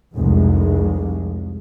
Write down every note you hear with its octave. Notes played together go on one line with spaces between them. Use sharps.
F1 C2 F2 G#3